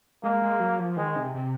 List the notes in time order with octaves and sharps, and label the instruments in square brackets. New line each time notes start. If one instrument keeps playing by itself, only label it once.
[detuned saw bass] G#3 [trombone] A#3
[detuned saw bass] G#3
F#3
F3
[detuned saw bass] D#3 [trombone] G#3
[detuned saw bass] C3
C3